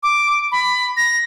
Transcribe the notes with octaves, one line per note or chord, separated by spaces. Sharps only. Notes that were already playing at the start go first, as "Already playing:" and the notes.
D6
B5
A#6